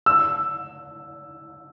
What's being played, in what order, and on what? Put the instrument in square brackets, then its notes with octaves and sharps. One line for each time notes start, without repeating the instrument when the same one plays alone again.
[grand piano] E6